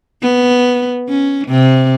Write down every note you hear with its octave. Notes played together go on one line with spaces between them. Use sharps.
B3
C#4
C3